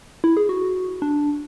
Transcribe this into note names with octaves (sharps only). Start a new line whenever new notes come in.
E4
G#4
F#4
D4